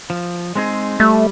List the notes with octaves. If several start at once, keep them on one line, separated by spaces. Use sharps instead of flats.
F3
G#3 C4 D#4 G#4
G3 A3